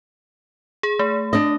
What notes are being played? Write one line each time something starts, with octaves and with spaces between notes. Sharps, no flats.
G#4
A3
D4 D#5